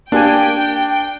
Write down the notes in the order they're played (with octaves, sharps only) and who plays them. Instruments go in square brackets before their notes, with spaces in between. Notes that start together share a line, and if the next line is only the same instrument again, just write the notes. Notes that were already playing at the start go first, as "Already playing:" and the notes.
[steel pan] A#3 G4 G#5 [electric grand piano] D4 [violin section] G5